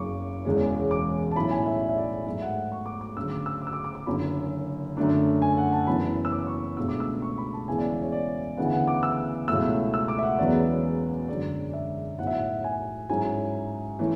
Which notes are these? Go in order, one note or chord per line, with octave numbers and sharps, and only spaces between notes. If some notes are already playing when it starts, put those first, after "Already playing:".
Already playing: F#1 F#2 C#3 C#6 D6
E1 E2 C#3 G#3 C#4
D6
A5
B1 A2 F#3 C#4 E4 B5
G#5
E5
D5
E5
D5
G#2 F#3 A3 E5
F#5
F#5
C#6
D6
D6
D2 C#3 F#3 E6
D6
E6
D6
E6
D6
D6
D6
F#1 F#2 D3 B5
F#2 D3 A3 D4
G#5
F#5
A5
F#1 F#2 E3 B3 B5
E6
D6
C#6
C#2 B2 A3 D4 E6
D6
E6
C#6
B5
A5
E2 C#3 G#3 B3 E4 G#5
D5
D5
C#5
D5
D2 C#3 E3 B3 E4 F#5
G#5
F#5
D6
E6
C#2 B2 F#3 A3 E4 E6
E6
D6
E5
F#5
E1 E2 C#3 F#3 B3 D5
F#2 D3 G#3 D5
D5
E5
B1 A2 F#3 F#5
E5
F#5
G#5
G#2 F#3 C#4 E4 G#5
E3 A3 C#4